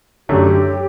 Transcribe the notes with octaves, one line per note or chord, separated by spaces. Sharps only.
F#2 D3 A3 G4